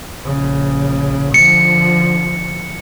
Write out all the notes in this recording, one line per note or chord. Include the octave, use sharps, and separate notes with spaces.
A#1 C#3
D3 F3 C#7